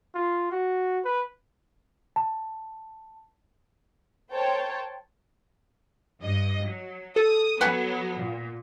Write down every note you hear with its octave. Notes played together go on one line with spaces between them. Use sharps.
F4
F#4
B4
A5
A#4 C5 C#5 G5 A5
G2 D#5
F#3
A4 D#6
F#3 B3 B4 F#5 G#5
A#2